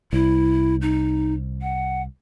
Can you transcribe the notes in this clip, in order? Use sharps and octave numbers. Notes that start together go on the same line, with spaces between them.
C2 E4
D#4
F#5